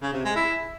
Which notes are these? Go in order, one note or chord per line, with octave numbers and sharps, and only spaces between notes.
C#3
C3
G#3
E4